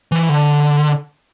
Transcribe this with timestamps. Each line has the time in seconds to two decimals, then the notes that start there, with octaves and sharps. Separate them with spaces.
0.12 E3
0.29 D3